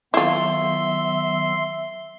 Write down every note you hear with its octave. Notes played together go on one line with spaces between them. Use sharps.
D#3 F#3 B3 E4 F4 E5 C6